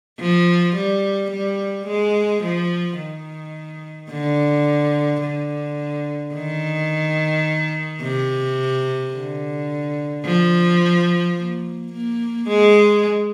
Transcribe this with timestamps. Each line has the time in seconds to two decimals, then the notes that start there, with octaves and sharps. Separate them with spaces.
0.20 F3
0.76 G3
1.31 G3
1.87 G#3
2.43 F3
2.99 D#3
4.11 D3
5.23 D3
6.34 D#3
8.02 C3
9.13 D3
10.25 F3
11.36 A#3
11.93 A#3
12.49 G#3